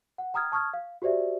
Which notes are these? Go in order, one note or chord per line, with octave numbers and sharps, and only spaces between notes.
F#5
G5 A#5 D#6 F6 G#6
A5 C#6 D#6 F6 G#6
F5
F#4 G4 C5 D5 E5